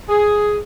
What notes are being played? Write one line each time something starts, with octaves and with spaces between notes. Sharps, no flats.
G#4